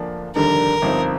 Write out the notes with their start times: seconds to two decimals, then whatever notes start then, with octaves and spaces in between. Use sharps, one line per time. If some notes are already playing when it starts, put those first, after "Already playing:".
Already playing: D2 D3 F3 A#3 D4
0.36 F1 D#2 D3 G3 D4 A#4
0.82 G1 G2 F3 C4 D#4